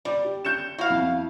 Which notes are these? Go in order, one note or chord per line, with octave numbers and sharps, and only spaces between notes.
G3 D5
G4
G6 C#7 E7
E4 F#4 F5
F2